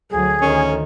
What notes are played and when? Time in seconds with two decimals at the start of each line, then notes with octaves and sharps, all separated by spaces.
0.11 D2 F#3 G#4
0.42 D2 D#3 C#4